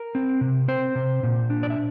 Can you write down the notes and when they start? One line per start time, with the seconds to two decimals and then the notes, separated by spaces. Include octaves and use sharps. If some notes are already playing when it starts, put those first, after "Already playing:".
Already playing: A#4
0.15 C4
0.41 C3
0.68 C4 C5
0.95 C3
1.23 A#2
1.50 D4
1.63 D5
1.70 E5